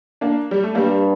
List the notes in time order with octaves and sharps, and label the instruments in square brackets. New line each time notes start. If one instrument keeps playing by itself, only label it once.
[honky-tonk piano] A#3 D4
G3
A3
[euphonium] G2 [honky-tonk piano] G3 A#3